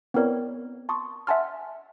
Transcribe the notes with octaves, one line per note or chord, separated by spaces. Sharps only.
B3 C4 E4 A#4 C#5 D5
A5 C6 C#6 D#6
E5 F#5 G#5 A5 C6 F6